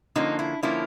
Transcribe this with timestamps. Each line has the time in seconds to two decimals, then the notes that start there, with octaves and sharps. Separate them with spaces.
0.15 D3 F3 A#3 C#4 D#4
0.39 E4
0.63 D3 F3 A#3 C#4 E4